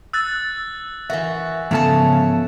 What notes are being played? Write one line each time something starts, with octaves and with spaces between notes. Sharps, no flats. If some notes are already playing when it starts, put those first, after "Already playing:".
E6 F#6 A6
E3 F#4 A#4 E5
G#2 C#3 F3 A3 B3 A#4 C#5 A5